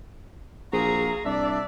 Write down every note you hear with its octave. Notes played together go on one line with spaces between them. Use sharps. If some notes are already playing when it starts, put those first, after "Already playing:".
A#1 C4 F#4 G#4 F5 A#5
C2 D4 D5 E5